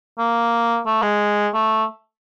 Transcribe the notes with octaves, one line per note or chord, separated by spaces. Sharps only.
A#3
A3
G#3
A3